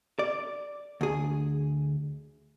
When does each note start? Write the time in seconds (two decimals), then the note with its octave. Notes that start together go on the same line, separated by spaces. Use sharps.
0.19 D5
1.01 D2 G#4